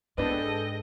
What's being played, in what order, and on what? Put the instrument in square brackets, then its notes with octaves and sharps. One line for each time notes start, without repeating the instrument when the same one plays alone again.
[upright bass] G#2 [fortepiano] B3 D4 B4 [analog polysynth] G#4 A4 G5 [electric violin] D#5